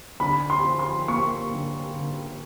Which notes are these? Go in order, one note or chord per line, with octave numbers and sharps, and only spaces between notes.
D3 B5
C6
F3
C6
A#3 C#6
D3
D3